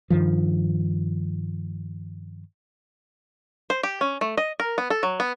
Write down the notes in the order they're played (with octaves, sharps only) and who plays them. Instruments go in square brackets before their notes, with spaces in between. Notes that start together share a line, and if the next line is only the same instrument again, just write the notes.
[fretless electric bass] G2 D#3 F3
[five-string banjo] C5
G4
C#4
A3
D#5
A#4
B3
A4
F#3
B3